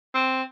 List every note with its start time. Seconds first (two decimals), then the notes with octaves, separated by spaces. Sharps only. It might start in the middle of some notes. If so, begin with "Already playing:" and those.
0.14 C4